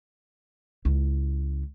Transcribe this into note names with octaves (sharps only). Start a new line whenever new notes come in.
C#2 E4